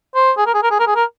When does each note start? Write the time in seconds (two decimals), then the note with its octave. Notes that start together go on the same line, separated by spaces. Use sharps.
0.15 C5
0.38 G#4
0.46 A#4
0.54 G#4
0.63 A#4
0.71 G#4
0.79 A#4
0.87 G#4
0.96 A#4